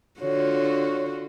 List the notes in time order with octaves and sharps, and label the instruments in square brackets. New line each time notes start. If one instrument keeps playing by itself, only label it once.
[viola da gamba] D3 F4 F#4 [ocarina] C#5